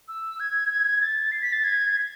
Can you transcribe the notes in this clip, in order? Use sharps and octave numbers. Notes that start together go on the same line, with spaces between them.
E6
G#6
A6
C7
B6
A6
G#6